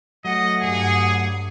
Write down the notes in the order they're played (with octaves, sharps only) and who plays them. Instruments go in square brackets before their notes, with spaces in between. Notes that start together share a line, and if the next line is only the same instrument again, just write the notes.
[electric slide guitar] F#3 A3 [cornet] D#5 [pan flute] F#5
[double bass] G2 [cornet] G#4